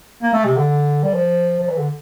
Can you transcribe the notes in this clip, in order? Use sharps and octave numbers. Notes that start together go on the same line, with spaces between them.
A#3
A3
C3
D3
G3
F3
F3
E3
D3